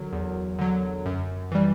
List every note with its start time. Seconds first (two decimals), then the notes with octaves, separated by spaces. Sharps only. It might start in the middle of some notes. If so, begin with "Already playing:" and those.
Already playing: D3 F#3 F#4 A#4
0.12 E2
0.59 D3 F#3
1.06 F#2
1.51 E3 G3